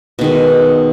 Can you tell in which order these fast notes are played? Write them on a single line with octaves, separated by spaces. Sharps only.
B2 D#3 G#3